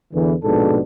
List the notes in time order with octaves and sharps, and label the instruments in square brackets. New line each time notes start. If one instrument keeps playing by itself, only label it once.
[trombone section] E2 D3 E3
A#1 G#2 B2 D4 A4